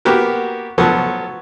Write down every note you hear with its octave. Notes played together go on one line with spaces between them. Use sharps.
A#3 B3 F#4 G4 A#4
F3 F#3 B3 F#4 A4